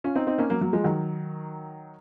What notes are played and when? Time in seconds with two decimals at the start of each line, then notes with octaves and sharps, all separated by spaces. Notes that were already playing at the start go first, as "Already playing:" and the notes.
0.04 C#4 F4
0.16 C4 D#4
0.27 C4 D#4
0.38 A#3 C#4
0.50 F#3 A#3
0.61 F#3 A#3
0.73 F3 G#3
0.84 D#3 F#3